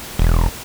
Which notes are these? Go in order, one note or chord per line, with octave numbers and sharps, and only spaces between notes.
E1